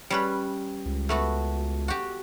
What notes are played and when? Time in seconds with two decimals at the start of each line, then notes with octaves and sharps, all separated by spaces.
0.10 G3 C#4 B4
0.86 C#2
1.09 A3 B3 F#4
1.88 F#4 G4